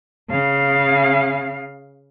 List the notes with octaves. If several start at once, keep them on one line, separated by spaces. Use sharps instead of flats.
C#3 F5